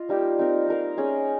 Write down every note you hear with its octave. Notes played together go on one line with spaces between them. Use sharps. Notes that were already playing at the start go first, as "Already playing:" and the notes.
Already playing: F4 D#5
G3 A#3 D#4 G4
C4 D#4 A#4
D#4 A#4 F5
C#4 G#4 D#5